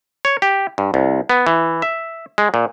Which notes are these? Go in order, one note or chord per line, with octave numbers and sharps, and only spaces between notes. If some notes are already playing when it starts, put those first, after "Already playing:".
C#5
G4
G2
C2
B3
E3
E5
G#3
A#2